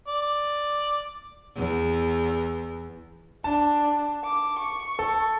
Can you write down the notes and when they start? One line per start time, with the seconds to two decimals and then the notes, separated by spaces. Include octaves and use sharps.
0.08 D5
1.56 E2
3.44 D4 A5
4.24 D6
4.59 C#6
4.99 A4